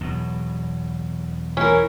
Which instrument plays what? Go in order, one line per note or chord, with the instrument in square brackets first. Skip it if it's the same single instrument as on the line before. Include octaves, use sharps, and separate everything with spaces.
[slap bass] E2 B2 F#3
[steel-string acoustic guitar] E3 A#4 [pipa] C#4